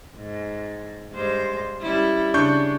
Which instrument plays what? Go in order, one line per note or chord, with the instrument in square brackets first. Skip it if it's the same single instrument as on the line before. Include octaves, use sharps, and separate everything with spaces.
[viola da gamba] G#2
G2 G#3 C5
G3 C#4 E4
[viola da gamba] C#3 [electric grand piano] D4 C#6 G6